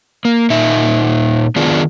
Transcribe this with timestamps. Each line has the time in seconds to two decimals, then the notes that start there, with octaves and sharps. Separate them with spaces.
0.25 A#3
0.50 A#2 D#4 E5
1.56 D#3 B3 D4 F4 G#4